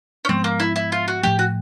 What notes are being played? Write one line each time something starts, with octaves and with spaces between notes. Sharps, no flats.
C#4
G#2 F3 G#3 B3 C4
A#3
E4
E4
F4
F#4
A2 F3 A3 G4
F#4